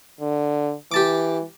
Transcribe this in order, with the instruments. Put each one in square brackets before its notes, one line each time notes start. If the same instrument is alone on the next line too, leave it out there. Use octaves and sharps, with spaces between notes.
[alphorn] D3
[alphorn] E3 [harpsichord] G4 A5 D6